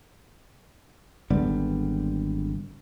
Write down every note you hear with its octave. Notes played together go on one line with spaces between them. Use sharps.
G#1 D3 G3 B3